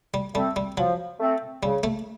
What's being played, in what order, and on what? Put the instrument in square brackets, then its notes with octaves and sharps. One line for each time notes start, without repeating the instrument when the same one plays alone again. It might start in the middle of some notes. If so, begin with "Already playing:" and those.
[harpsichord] G3
[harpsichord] G3 [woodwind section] A3 C4
[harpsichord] G3
[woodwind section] F3 [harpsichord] F#3
[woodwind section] A3 C4
[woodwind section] C#3 [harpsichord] G3
[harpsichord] A3